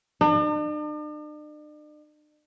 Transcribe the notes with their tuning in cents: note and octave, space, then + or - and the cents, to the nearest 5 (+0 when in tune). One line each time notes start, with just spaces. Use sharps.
D4 +45